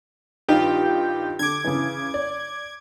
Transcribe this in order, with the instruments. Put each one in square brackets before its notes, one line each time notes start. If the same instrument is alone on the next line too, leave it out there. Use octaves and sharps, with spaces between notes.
[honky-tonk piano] G2 D#3 D#4 [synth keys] F4 G4 G5
[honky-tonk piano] D3 [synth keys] D6 G#6
[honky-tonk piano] C#3 E3
D5